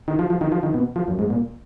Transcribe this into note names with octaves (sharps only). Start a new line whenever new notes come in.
D#3
F3
F3
D#3
F3
D#3
B2
F3
F#2
G#2
A#2